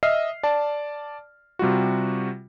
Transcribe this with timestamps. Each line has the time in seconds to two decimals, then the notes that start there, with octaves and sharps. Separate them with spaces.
0.03 D#5 E5 F6 C7
0.43 D5 A5
1.59 C3 G3 F4 F#4